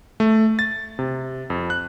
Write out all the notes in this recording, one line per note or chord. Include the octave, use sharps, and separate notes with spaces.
A3
A6
C3
F2
F#6